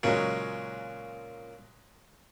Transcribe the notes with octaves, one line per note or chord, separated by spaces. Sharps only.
A#2 C#3 F#3 G#3 C#4